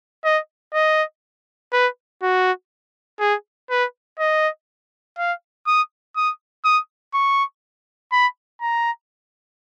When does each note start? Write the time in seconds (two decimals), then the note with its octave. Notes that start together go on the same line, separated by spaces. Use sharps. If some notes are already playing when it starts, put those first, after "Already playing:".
0.24 D#5
0.74 D#5
1.73 B4
2.22 F#4
3.20 G#4
3.70 B4
4.19 D#5
5.18 F5
5.67 D#6
6.16 D#6
6.64 D#6
7.14 C#6
8.12 B5
8.61 A#5